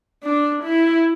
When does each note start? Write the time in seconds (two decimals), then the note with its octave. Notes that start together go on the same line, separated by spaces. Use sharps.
0.24 D4
0.64 E4